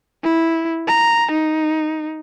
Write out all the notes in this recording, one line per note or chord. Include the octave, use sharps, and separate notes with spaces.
E4
A#5
D#4